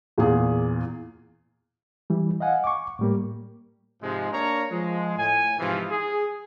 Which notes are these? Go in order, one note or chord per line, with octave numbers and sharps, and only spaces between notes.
E2 A#2 G#4
E3 G3
D#5 F5 F#5 G#5
C#6 D6
A2 G3 A#3
G#2 C3 F3 G#3
A#3 D4 A#4 C#5 A#5
F3 G#3
A2 G#5
G#2 C3 E3 F3
G#4